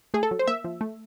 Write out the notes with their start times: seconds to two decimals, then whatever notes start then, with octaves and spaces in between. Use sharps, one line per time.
0.14 A3 G#4
0.23 A4
0.31 F#3
0.39 C5
0.47 A#3 E5
0.64 F3
0.81 A3